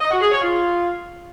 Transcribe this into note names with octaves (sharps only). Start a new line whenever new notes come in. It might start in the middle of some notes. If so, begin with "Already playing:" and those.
D#5
F#4
G#4
C#5
F4